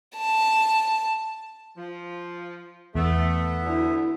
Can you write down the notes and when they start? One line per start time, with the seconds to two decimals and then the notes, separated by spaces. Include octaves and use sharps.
0.17 A5
1.77 F3
2.95 E2 A3 B3 E5
3.65 D2 D3 E4